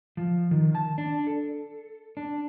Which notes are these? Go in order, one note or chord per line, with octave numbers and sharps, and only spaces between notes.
F3
D#3
A5
D4
A4
D4